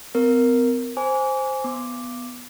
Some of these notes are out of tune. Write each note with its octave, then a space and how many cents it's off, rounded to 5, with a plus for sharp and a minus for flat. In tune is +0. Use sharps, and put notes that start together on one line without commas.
C4 -45 A#4 +0
C5 +0 G#5 +0 D6 -35
B3 +0 D6 +0